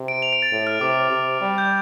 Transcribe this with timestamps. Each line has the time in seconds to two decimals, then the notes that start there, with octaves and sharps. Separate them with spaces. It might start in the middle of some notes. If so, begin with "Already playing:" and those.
Already playing: C3
0.08 D7
0.22 F7
0.33 D7
0.42 A6
0.52 A2
0.67 F6
0.81 C3 D6
1.11 C3
1.41 G3
1.58 G6